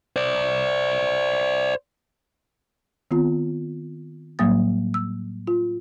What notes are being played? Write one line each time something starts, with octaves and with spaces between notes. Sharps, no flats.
C5 D5
D#3 B3 C4 F4
A2 F#3 G3 A#3 D#6 A6
E6
F4